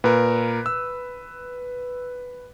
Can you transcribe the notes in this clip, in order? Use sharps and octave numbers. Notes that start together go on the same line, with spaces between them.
A#2 A#4 B4
E6